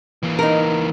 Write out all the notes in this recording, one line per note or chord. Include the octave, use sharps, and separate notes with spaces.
E3 A#3
D#4 A#4